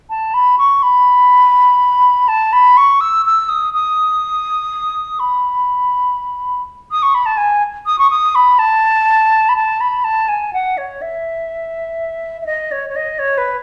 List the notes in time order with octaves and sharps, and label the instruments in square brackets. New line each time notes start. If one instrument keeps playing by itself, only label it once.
[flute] A5
B5
C#6
B5
A5
B5
C#6
E6
E6
D#6
D#6
B5
D#6
C#6
B5
A5
G#5
D#6
C#6
D#6
B5
A5
B5
A5
B5
A5
G#5
F#5
C#5
E5
E5
D#5
C#5
C#5
D#5
C#5
B4